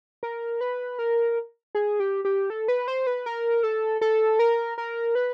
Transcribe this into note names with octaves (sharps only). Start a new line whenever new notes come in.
A#4
B4
A#4
G#4
G4
G4
A4
B4
C5
B4
A#4
A4
A4
A#4
A#4
B4